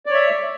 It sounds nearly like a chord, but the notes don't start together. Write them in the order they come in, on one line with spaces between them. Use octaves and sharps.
D5 C#5 E5